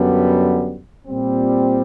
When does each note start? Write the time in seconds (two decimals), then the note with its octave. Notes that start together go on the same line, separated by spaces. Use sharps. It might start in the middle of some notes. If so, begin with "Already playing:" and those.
Already playing: F#2 D3 G3 B3
1.07 A#2 G3 C4